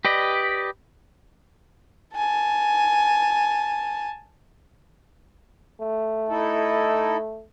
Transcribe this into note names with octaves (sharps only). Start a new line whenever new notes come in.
G4 B4 D5 D#5
G#5 A5
A3
D#4 E4 A4